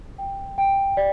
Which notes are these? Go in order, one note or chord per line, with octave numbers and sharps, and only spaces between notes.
G5
G5
D5